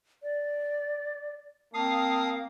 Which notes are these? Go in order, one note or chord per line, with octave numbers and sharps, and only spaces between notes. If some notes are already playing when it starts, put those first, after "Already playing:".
D5
A#3 C4 F5 A5 D#6